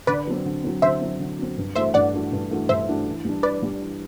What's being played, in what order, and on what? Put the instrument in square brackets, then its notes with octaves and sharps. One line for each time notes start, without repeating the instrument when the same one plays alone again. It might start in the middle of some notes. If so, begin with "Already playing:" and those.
[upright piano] D3 [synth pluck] B4 D5
[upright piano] F#3 C4
D3
F#3 C4
[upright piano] D3 [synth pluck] C5 E5
[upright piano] F#3 C4
D3
F#3 C4
G2
[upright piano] E3 A3 D4 F#4 [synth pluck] C5 E5
[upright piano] G2 [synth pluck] D5 F#5
[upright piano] E3 A3 D4 F#4
G2
E3 A3 D4 F#4
[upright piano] G2 [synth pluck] C5 E5
[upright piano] E3 A3 D4 F#4
E3
G3 D4
[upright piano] E3 [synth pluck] B4 D5
[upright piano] G3 D4
E3